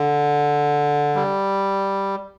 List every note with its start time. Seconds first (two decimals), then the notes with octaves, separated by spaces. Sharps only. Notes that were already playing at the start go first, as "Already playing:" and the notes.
Already playing: D3
1.15 G3